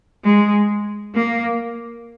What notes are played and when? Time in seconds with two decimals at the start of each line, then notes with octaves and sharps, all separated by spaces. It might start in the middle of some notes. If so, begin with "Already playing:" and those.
0.24 G#3
1.15 A#3